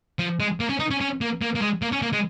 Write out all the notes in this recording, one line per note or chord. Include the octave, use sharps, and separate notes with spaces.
F3
G#3
A#3
C#4
D#4
C#4
C#4
A#3
A#3
A#3
G#3
A#3
C#4
A#3
G#3